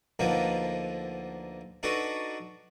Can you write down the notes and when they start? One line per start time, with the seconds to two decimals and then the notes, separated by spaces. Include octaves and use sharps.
0.19 D2 D3 F3 A#3 D#4 B4
1.83 D4 D#4 F#4 A4 B4